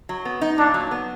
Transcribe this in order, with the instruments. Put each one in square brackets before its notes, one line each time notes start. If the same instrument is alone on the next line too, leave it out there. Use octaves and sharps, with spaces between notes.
[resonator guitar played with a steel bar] F#3
B3
D#4
[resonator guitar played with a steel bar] A#2 [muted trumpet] D4
[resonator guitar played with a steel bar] F#3
B3